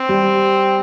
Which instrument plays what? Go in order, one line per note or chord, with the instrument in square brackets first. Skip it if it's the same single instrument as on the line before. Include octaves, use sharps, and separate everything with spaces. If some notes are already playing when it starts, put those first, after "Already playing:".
Already playing: [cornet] C4
[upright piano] G3